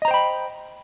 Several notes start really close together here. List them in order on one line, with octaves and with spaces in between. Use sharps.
D#5 A#5 C5 G5 B5